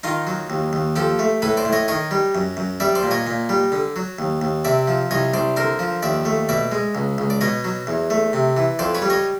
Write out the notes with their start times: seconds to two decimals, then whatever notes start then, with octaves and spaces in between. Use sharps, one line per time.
0.03 D#3 D#4 F4
0.27 F#3
0.50 D#2
0.73 D#2
0.96 F3 G4 A4
1.19 A3
1.42 A2 A4 B4
1.57 C5 D5
1.65 A2
1.73 C#5 D#5
1.88 D#3 C#5 D#5
2.11 G3
2.35 F#2
2.57 F#2
2.80 G3 D5 E5
2.95 C5 D5
3.03 A#2
3.11 C#5 D#5
3.27 A#2
3.49 G3
3.72 D3
3.96 F#3
4.19 D#2
4.42 D#2
4.65 C3 D5 E5
4.88 F3
5.11 C2 C#5 D#5
5.34 C2 C5 D5
5.56 D3 A#4 C5
5.79 F3
6.03 D#2 D5 E5
6.25 A3
6.49 B2 D5 E5
6.72 G#3
6.95 C#2
7.18 C#2
7.30 D5
7.41 B2 C#5 D#5
7.64 F#3
7.87 E2
8.10 A3
8.33 C3
8.57 E3
8.79 F2 C5 D5
8.95 B4 C#5
9.02 G3
9.10 C#5 D#5